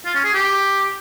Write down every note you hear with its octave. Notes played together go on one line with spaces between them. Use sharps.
F4
C#4
G#4
G4